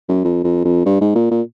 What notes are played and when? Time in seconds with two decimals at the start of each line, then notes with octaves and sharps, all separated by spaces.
0.09 F#2
0.24 F2
0.44 F2
0.65 F2
0.85 G2
1.01 G#2
1.15 A#2
1.31 A#2